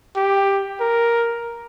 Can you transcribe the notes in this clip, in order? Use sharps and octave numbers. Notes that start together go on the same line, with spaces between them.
G4
A#4